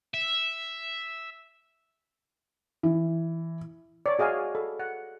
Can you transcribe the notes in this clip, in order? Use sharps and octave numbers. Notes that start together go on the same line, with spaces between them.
E5
E3
C#5 D5
F#4 G#4 D#5 F5 G#5
A4
F#5